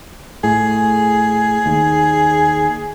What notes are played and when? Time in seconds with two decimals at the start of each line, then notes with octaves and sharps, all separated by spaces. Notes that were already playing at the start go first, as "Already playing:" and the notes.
0.44 A2 G#4
1.66 D#2